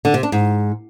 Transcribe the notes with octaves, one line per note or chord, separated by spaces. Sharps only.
D3
C3
D4
G#2